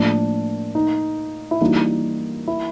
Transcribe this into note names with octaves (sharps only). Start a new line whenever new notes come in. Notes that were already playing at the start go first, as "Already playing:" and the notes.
Already playing: A2 F3 A#3 D4
D#4
E4
E3 G3 A#3 D4 D#4 F#4
E4